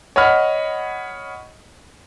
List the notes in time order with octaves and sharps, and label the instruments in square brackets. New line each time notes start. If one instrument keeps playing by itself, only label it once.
[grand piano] C#5 D#5 F#5 B5 F6